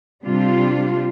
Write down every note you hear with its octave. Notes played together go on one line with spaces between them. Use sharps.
C3 G3 D4 F4